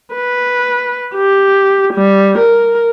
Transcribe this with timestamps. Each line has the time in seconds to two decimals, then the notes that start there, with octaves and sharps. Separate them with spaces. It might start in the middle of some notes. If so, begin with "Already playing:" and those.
0.15 B4
1.15 G4
1.94 G3
2.39 A#4